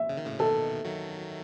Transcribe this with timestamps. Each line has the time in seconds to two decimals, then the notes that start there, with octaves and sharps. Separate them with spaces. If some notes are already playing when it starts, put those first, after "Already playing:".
Already playing: E5
0.09 C#3
0.17 D#3
0.26 A2 C#3
0.39 B2 D#3 A4
0.85 D#3 F#3